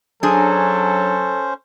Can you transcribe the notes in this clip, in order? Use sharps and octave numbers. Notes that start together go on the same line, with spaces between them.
F#3 C#4 D4 G#4 A4 C5